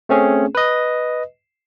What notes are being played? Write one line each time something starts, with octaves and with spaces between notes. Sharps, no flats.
A3 C4 C#4 G#4
B4 D#5